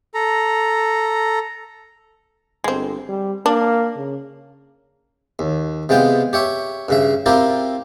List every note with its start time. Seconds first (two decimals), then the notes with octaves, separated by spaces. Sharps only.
0.14 A4 A#5
2.64 G1 G#3 C4
3.09 G3
3.46 A#3 D4
3.96 C#3
5.39 D#2
5.89 C3 G#3 B3 F4 G5
6.33 G4 C#5 E5
6.89 G2 C#3 E5
7.26 C4 E4 F4 G4 A#4